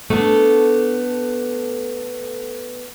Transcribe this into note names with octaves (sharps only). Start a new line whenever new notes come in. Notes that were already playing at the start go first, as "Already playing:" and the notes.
A3 B3 D4 A4